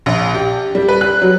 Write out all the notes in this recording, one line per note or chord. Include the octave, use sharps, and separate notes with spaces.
A#1
G4
G3
B4
F#6
F#3